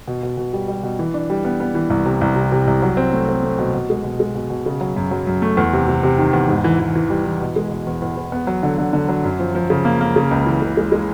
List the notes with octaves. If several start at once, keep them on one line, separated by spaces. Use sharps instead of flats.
B2
B2
B2
G3
G3
B2
E3
D4
G3
B3
B3
E3
C2
C3
C2
C3
C3
C2
F#3
C4
A3
C4
A3
B2
B2
G#3
B2
G#3
B2
B2
C#3
F#3
F#2
F#3
F#2
A3
E2
C3
C3
C3
D#3
E2
G#2
E3
E3
E3
G3
E3
B2
G#3
B2
E2
E2
E2
B3
F#3
D3
D3
D3
F#3
F#2
F3
F3
C#3
A#3
A#3
C#3
C#2
E3
C#3
G#3
G#3